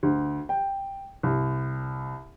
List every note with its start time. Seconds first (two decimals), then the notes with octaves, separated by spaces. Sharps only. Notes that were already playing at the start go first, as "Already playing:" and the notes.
0.03 D2
0.49 G5
1.23 C2